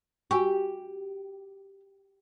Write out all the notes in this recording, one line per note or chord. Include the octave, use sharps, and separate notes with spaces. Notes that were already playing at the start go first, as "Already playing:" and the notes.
F#4 G4 G#5 C#6